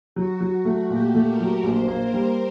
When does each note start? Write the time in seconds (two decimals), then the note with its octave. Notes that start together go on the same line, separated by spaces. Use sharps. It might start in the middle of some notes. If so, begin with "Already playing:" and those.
0.16 F#3 F#4
0.40 F#3
0.65 A3
0.90 A#2 G4
1.15 A3
1.27 A#4
1.40 F#3
1.63 A#1 C5
1.88 A#3
2.01 A#4
2.14 G3